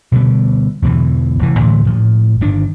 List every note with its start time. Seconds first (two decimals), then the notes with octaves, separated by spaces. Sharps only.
0.12 B2 D3 E3 G3
0.82 E2 B2 D3 E3
1.39 F1 E3
1.59 A2 D3 E3 A3
1.85 A2 F3
2.41 G1 D#3 D4